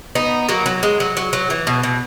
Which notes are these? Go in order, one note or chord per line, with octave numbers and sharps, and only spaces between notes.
B3 D#4
F#3 A#3
F#3
G#3
F#3
F#3
F#3
E3
B2
B2